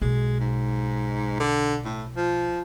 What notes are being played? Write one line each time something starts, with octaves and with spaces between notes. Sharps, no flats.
B1 G#3
G#2
D3
A2
F3